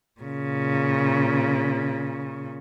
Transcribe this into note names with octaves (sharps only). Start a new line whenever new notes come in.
A#2 C#3